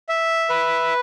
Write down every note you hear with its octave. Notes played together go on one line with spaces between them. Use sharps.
E5
B4